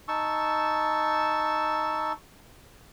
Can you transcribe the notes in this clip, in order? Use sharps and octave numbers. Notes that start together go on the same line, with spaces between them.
D#4 A5 C#6 E6